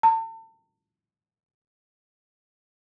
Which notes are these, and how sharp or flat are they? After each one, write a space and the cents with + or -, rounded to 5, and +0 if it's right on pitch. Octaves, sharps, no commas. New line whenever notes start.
A5 +40